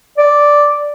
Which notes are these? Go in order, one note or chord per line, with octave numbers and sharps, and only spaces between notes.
D5